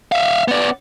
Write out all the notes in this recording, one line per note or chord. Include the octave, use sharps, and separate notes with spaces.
E5 F5
B3 D5